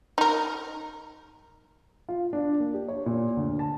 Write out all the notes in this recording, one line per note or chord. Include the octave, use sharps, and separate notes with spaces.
D#4 A#4
F4
D4
A#3
G4
C#5
A#2
D2
A5